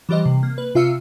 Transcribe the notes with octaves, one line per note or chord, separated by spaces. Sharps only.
E3 G3 G4 C5 D#5
C3
A#3
B4
C3 F4 E5 F5 E6 C#7